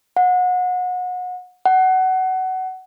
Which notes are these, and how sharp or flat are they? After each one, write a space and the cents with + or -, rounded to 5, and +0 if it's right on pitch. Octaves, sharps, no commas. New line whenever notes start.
F#5 -30
F#5 +20